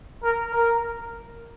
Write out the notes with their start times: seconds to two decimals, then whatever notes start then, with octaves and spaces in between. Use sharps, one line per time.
0.23 A#4
0.53 A#4